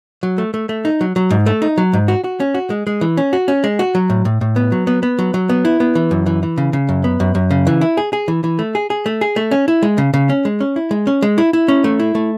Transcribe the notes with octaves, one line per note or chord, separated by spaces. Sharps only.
F#3
A3
A3
A3
D#4
F#3
F#3
G#2
A3
D#4
F#3
G#2
F#4
F#4
C#4
F#4
G#3
G#3
E3
C#4
F#4
C#4
G#3
F#4
F#3
A2
A2
A2
B3
F#3
B3
B3
F#3
F#3
B3
E4
B3
E3
F#2
E3
E3
C#3
C#3
F#2
B3
F#2
F#2
C#3
E3
E4
G#4
G#4
E3
E3
A3
G#4
G#4
A3
G#4
A3
C#4
E4
G#3
C#3
C#3
C#4
G#3
C#4
E4
G#3
C#4
G#3
E4
E4
C#4
A3
E4
A3